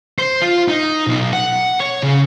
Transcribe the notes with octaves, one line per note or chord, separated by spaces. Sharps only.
C5
F4
D#4
B1
F#5
C#5
C#3